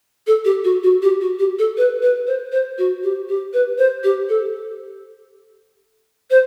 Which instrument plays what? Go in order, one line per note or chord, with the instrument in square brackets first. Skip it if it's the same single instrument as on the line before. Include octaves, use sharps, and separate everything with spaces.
[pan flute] A4
G4
F#4
F#4
G4
F#4
G4
A4
B4
B4
C5
C5
F#4
G4
G4
B4
C5
G4
A4
C5